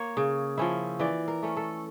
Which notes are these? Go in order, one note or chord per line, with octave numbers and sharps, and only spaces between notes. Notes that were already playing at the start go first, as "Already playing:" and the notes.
Already playing: A#3 C#5
C#3
F3 C#4 E4
E3 D5
A#4
A3 C#4
A4